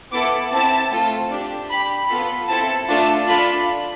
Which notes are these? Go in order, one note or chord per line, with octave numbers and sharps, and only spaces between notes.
B3 E4 A4 D6
C4 E4 A4 A5
A3 C4 F4 A4
D4 G4
D4 G4 B5
B3 F4 A4 B5
C4 E4 A4 A5
A3 D4 F4 A4 A5
D4 F4 A4 B5